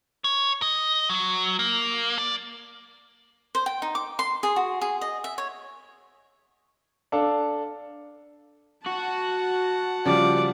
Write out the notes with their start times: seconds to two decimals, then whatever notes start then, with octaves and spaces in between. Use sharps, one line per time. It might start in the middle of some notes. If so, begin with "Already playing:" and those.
0.24 C#5
0.62 D#5
1.10 F#3
1.59 A#3
2.18 D5
3.55 C5
3.66 G5
3.82 D#4
3.95 D6
4.19 C6
4.43 G#4
4.56 F#4
4.81 G#4
5.01 D#5
5.24 E5
5.38 C#5
7.12 D4 A4 F5
8.86 F#4 F#5 A5
10.06 C#3 F3 G3 D5